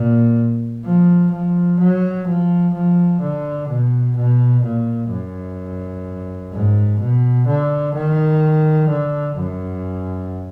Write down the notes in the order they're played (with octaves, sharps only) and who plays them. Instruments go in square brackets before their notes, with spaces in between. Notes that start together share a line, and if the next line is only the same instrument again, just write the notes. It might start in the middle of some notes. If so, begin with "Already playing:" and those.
Already playing: [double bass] A#2
F3
F3
F#3
F3
F3
D3
B2
B2
A#2
F#2
G#2
B2
D3
D#3
D3
F#2